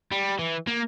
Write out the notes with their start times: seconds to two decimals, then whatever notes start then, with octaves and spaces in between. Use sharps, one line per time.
0.12 G3
0.39 E3
0.67 A#3